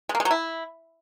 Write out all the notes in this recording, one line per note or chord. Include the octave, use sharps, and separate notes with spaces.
G#3
A#3
G#3
F#3
E4